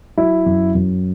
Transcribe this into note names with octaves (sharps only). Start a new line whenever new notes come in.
F#3 E4
F#2
F#2